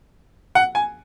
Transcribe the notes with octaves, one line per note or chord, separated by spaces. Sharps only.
F#5
G#5